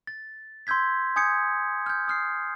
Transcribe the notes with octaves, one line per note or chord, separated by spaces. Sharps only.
A6
C6 E6 G6 G#6 B6
G#5 D#6 G6 G#6 C#7
F6 G6
D#6 F6 C7